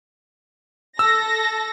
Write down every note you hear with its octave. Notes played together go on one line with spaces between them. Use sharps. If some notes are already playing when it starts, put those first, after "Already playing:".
A4 E6 A#6